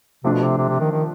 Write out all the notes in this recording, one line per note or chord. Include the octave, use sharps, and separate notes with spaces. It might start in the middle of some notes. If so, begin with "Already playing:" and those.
C3 F3 A3 D4
B2
C3
C3
C3
D#3
D#3